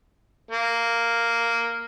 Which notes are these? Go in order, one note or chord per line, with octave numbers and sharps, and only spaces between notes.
A#3